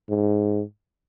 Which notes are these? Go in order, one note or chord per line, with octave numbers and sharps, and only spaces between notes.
G#2